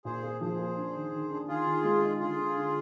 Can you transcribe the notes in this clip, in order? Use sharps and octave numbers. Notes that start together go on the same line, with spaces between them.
A#2 G#4 C5
A#3
F3 G#4 C5
A#3
D4
D#3
D#3
D4
D#3 F4 G#4
D#3
G#3
D#4
D3 F4 G#4
D3
D3